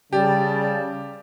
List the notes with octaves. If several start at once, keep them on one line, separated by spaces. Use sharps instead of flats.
C#3 G3 G4 D5 A5